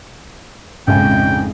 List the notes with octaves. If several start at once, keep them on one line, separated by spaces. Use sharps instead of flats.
A#1 F2 G#2 C#3 G5 G#5